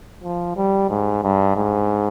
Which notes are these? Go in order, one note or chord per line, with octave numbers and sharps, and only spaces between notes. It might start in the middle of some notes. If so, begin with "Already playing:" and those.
F3
G3
G#2
G2
G#2